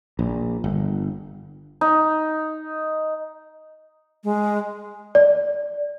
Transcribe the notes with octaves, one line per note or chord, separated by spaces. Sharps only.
A#1
G1
D#4
G#3
D5